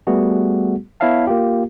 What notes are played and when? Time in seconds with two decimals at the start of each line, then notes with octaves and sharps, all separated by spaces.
0.07 G3 A3 B3 F#4 G#4
1.00 B3 E4 C#5 E5 F5 A5
1.27 A#3 F4 G4